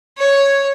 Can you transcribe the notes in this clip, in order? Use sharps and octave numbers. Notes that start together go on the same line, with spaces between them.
C#5